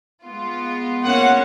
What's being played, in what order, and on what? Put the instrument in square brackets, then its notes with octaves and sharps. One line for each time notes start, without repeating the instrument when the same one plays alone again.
[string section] G#3 B3 F4
[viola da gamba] A#3 C#4 [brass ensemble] F#5